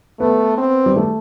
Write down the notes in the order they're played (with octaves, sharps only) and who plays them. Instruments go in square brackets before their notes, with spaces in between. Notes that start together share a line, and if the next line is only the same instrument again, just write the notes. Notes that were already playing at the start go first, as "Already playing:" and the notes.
[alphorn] A3 [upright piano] B3
[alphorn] C4
[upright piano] G3
A3